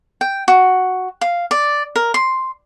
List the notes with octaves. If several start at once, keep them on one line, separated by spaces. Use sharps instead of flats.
G5
F#4
F5
D5
A#4
C6